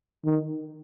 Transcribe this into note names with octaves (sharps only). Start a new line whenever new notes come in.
D#3